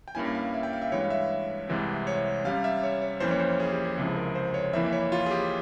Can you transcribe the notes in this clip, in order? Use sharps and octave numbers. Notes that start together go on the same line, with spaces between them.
G5
G2 G3 A#3 C#4 E4 G#5
F5
E5
G5
F5
E5
G2 E3 G#3 C#5
F5
E5
C2 C3 E3 G#3 C4
C#5
C3 G3 C#4 F5
E5
C#5
C#5
F2 E3 A#3 C#4 C5
C#5
C5
G#4
G4
G#4
C#2 C3 F3 C4 E4 G#4
A#4
C5
C#5
F2 E3 A#3 E4 E5
E5
C#5
F4
G#4
G4